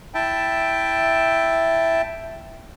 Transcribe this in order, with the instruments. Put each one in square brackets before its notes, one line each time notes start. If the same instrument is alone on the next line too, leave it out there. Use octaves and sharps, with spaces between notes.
[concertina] E4 E5 G5 A5